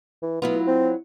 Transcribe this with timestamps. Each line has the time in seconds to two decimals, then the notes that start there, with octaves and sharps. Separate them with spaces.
0.22 E3
0.42 F#3 B3 E4 F4
0.67 C4